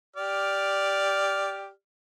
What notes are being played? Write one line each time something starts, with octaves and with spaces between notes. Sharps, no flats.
G4 D5 F6